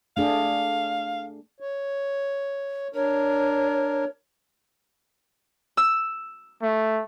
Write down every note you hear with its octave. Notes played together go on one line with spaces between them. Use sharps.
A3 D4 G#4 F5
C#5
D4 A#4 C#5
E6
A3